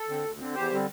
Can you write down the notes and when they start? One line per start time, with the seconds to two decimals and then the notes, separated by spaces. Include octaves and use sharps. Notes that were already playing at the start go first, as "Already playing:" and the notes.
Already playing: A4
0.09 D3 C4
0.25 D2
0.39 D3 C4
0.55 E2 G4 C5
0.71 D3 G3 C4